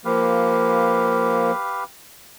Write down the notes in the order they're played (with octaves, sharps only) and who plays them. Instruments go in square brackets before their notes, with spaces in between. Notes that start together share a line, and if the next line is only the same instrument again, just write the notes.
[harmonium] F3 A#3 [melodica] G4 B4 F5